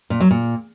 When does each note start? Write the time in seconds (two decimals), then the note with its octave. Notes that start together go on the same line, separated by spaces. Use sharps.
0.10 A#2
0.20 F#3
0.31 A#2